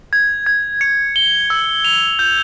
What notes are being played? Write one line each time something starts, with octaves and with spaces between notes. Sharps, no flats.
G#6
G#6
C#7
G7
E6
F7
G6